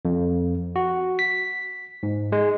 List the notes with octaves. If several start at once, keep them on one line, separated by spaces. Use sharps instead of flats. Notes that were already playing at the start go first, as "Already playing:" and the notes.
F2
F#4
B6
G#2
G#3